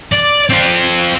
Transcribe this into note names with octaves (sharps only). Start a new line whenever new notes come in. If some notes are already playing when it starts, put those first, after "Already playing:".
D5
C4 F4